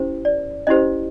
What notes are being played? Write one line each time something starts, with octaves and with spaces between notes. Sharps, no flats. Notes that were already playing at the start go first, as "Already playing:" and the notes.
Already playing: C#4 E4 G4 C5
D5
C#4 E4 G4 C5 D#5